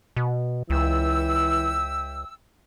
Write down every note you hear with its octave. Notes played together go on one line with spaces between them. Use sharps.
B2
C#2 E3 E5 G5 E6